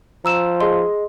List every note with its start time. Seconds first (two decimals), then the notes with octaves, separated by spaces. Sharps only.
0.25 F3 A#5 E6 E7
0.61 G#4 D#5 C6